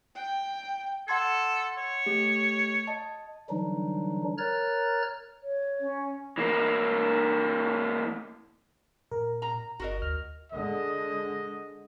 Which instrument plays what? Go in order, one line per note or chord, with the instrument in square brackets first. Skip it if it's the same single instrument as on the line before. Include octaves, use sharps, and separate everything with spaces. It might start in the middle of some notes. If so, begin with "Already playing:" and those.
[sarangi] G5
[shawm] A4 [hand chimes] F#5 C6 G#6
[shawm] C#5
[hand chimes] A3 G4
D#5 A5
[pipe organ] D3 E3 F#3 G3 D4 D#4
A#4 C#5 A#5 F6 F#6 A6
[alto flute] C#5
[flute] C#4
[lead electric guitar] E3 A#3
[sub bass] A#2 [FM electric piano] A#4
[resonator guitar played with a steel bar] A#5
[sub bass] G1 [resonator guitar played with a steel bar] F#4 A#4 D#5
[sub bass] D2 [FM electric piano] F6
[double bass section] D3 G#3 [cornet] D#5